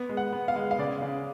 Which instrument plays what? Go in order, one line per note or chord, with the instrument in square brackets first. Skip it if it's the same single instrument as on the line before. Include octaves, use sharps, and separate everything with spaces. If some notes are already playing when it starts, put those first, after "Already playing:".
Already playing: [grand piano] B3
G#3
F#5
B3
F5
G#3
F5
C#3 D5
C#3